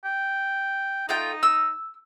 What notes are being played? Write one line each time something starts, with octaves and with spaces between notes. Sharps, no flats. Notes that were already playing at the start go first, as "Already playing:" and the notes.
G5
A3 D#4 F4 G5
E6